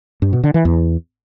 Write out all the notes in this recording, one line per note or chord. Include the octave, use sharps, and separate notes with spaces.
G2
B2
D3
E3
E2